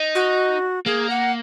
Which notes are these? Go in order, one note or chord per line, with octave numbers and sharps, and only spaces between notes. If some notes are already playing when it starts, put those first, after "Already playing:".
Already playing: D#4
F#4
A#3 G#4
F#5